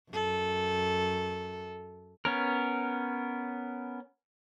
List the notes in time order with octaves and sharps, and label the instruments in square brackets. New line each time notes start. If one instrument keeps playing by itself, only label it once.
[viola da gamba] F#2 A4
[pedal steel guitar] B3 C#4 A#4